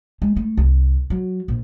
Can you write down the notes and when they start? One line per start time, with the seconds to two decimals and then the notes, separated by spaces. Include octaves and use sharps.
0.22 G#3
0.37 A3
0.57 C2
1.10 F#3
1.48 A#1